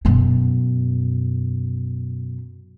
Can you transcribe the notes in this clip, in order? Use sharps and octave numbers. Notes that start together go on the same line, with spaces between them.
F#2 B2